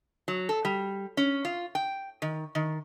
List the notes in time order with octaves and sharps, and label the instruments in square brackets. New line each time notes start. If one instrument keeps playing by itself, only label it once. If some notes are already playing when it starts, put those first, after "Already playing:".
[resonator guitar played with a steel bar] F#3
A4
G3
C#4
F4
G5
D#3
D#3